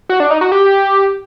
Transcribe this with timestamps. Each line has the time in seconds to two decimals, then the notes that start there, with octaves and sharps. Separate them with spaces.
0.09 F#4
0.20 D4
0.31 D#4
0.41 F#4
0.52 G4